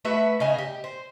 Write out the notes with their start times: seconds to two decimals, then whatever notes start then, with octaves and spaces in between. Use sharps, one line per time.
0.05 A3 F#4 B4 E5
0.40 C#3 D#5 G#5
0.58 G4
0.84 C5